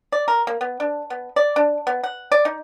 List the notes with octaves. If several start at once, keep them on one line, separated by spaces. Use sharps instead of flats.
D5
A#4
A#3
B3
D4
B3
D5
D4
B3
F#5
D5
D#4